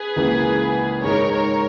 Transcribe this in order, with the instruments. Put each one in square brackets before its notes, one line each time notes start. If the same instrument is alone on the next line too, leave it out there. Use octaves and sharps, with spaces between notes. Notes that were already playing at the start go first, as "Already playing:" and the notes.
Already playing: [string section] G#4 B4
[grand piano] C#2 C#3 E3 A#3
[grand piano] G#2 D#3 G#3 D#4 [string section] A#4 C#5
[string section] A#4 C#5